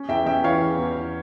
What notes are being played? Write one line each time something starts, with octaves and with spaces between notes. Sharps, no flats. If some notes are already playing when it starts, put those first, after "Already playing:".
Already playing: C#4
E2 E5 G5
C#4 E5 G5
E3 C#5 F5
E2
E2
E3